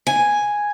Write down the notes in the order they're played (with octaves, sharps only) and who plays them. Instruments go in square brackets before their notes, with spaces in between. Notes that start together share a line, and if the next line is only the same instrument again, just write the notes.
[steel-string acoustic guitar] G#5